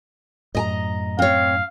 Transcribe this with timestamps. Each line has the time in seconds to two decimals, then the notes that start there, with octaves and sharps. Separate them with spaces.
0.55 F#2 A2 D#5 G#5 A#5
1.19 C4 C#5 F5